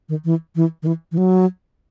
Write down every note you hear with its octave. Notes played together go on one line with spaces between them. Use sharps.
D#3
E3
E3
D#3
E3
E3
F#3